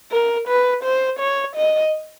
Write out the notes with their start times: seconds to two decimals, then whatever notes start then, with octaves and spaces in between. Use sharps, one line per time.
0.12 A#4
0.48 B4
0.84 C5
1.19 C#5
1.56 D#5